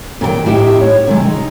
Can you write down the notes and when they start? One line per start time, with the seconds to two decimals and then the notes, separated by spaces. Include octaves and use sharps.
0.21 A#2 D#3 A#4 G5
0.46 A2 C4 D#4 E4 G4
0.81 C#5
1.07 C3 D#3 G#3
1.25 D#4